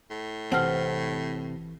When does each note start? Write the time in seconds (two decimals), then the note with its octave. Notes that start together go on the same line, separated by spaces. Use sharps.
0.10 A2
0.52 G1 C3 E3 C4 F#5 A5 F6